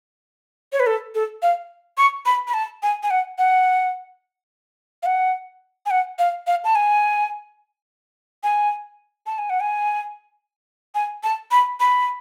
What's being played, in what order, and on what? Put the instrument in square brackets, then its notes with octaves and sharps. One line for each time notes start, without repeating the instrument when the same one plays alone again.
[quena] C#5
B4
A4
A4
F5
C#6
B5
B5
A5
G#5
G#5
F#5
F#5
F5
F#5
G#5
F#5
F5
F5
A5
G#5
G#5
A5
G#5
F#5
G#5
G#5
A5
B5
B5